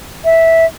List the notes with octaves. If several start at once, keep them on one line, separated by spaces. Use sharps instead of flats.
E5